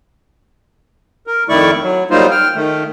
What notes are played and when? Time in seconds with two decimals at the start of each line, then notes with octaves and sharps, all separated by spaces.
1.27 A#4
1.49 F2 D#3 A3 E4 D5 C#6
1.82 F#3
2.11 F#3 G3 A#3 D#4 F4 C5
2.31 G5 F6
2.55 D#3 A3